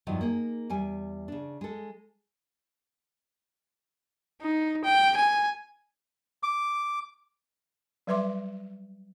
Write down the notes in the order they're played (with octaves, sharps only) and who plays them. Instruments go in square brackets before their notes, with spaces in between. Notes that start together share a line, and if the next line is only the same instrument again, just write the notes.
[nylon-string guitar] E2 G2 D#3 F3 F#3
A#3 D#4 G#4
E2 G3 G#5
C#3 D4
G#3 A4
[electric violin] D#4
G5
G#5
[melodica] D6
[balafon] F#3 G3 B4 E5 C6 D6